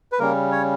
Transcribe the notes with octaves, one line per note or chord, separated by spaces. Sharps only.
B4
C#3 G3 A#3 C#4 A#4
C#5